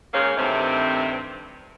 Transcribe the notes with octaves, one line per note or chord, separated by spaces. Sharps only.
G#2 D#3 A#3 C#4 G#4 F5
G2 C3 D#3 A3 C4